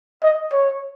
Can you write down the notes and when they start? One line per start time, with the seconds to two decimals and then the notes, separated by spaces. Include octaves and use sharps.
0.23 D#5
0.52 C#5